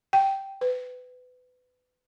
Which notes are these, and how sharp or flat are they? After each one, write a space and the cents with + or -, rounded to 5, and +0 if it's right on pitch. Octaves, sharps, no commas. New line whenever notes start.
G5 -10
B4 +25